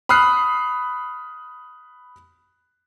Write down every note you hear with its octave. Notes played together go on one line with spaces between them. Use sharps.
B5 D#6 F6 F#6 C7